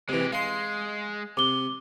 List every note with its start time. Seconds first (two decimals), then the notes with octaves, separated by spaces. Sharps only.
0.09 C3 E3 G#3 G4
0.33 G#3 F5 C6
1.37 C3 D6 G7